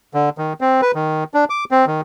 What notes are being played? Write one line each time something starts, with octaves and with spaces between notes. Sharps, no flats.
D3
D#3
C4
B4
D#3
D4
D6
C4
D#3